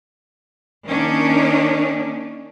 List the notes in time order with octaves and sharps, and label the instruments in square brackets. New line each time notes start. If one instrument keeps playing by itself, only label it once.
[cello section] D#3 A#3 C#4 D4